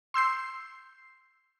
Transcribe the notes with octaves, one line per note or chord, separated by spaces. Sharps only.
C6 E6 G6 C7